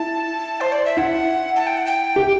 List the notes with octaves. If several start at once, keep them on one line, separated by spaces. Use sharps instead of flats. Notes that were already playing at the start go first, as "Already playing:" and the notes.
Already playing: E4 A5
C5
D5
E5
E4 F#5
A5
G5
F#5
G5
G4